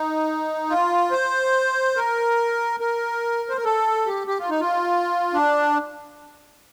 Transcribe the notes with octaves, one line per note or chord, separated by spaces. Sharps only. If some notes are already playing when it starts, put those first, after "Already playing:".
Already playing: D#4
F4
C5
A#4
A#4
C5
A#4
A4
G4
G4
F4
D#4
F4
D4